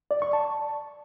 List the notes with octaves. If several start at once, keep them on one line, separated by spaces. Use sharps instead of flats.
D5
C#6
A5